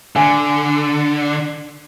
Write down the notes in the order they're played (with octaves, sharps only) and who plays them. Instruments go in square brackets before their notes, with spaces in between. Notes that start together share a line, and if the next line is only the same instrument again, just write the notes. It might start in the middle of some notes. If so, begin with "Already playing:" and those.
[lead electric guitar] D3 [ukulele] G#5